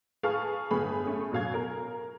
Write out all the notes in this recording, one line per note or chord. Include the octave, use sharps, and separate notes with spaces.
G#4 B4 F5 A5 C#6 F6
G1 B3 G#4 B5
A3 C#4 G#4
F#2 B2 F5 G#6
A#4